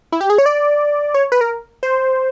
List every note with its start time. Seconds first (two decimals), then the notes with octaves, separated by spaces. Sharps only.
0.12 E4
0.21 G4
0.30 G#4
0.38 C#5
0.46 D5
1.14 C#5
1.32 B4
1.41 A#4
1.83 C5